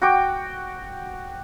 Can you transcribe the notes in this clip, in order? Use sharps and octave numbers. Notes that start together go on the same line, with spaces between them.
F#4 G5 D6